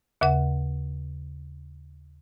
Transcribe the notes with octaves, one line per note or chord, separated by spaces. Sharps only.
D#2 C#3 F#5